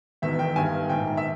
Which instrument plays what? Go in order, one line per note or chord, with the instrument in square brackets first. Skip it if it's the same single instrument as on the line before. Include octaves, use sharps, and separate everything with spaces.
[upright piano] E1 E2 D#3 E5
G5
G1 G2 D#3 G#5
A#1 G#2 D#3 G5
E5